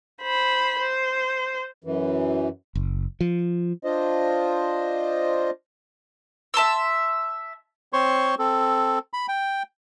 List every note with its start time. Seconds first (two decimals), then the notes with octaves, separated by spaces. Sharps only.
0.23 C5 B5
0.79 C5
1.84 F#2 E3
2.75 F#1
3.21 F3
3.84 D4 F4 C5 D#5
6.54 E5 A5 C6 E6
7.93 C4 C5 C#5 C6 C#6
8.39 C4 A4
9.13 B5
9.28 G5